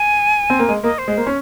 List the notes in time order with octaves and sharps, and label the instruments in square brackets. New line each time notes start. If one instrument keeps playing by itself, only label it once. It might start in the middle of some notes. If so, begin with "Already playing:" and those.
Already playing: [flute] G#5
[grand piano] C4
A#3
G#3
[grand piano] A#3 [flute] D#5
[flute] C5
[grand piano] G#3
A#3
C#4